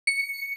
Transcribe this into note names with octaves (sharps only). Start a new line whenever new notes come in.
C#7